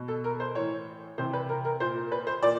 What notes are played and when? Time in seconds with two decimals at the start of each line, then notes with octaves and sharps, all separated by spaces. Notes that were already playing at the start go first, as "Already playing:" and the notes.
Already playing: B2
0.08 A4
0.24 A#4
0.40 C5
0.55 A2 E3 C#5
1.18 C3 E3 C5
1.33 B4
1.49 A#4
1.65 A#4
1.80 A#2 C5
2.12 B4
2.27 C5
2.42 A#2 D5